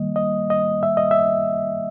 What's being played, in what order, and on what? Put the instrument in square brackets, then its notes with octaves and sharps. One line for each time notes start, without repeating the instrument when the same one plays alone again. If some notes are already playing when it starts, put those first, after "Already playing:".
Already playing: [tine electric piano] D#3 G3 A#3 [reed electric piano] D#5
[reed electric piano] D#5
D#5
E5
D#5
E5